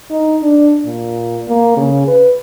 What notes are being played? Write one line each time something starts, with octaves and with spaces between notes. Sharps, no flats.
D#4
D4
A#2
A#3
C#3
B4